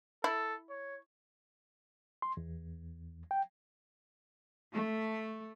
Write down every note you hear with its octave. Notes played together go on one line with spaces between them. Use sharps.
E4 A4
C#5
C6
E2
G5
A3